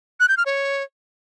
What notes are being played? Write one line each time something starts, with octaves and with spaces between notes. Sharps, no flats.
F#6
G6
F6
C#5